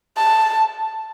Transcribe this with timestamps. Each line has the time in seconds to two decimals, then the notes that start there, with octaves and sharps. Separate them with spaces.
0.17 A5